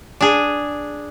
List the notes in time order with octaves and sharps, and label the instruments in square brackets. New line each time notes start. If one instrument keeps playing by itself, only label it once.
[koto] D4 G#4